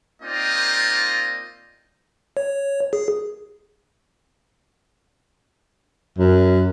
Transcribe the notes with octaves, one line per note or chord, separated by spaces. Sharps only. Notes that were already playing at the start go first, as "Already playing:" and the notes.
A#3 C4 D#4 F4 D5 D#5
C#5
G#4
F#2